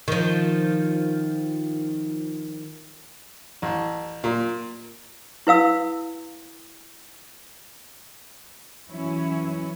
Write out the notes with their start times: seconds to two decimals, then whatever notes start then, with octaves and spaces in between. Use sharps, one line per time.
0.08 D#3 F3
3.62 A1
4.24 A#2
5.47 E4 B4 F5 E6
8.90 E3 F#3 C#4 E4